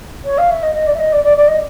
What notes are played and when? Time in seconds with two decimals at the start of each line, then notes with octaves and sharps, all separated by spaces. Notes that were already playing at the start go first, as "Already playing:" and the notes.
0.25 C#5
0.38 F5
0.50 E5
0.63 D#5
0.74 D#5
0.87 D5
0.94 E5
1.00 D#5
1.12 D5
1.24 D5
1.37 D5
1.48 D#5